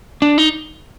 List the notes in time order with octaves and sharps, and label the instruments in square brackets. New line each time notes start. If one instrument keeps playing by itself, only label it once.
[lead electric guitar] D4
D#4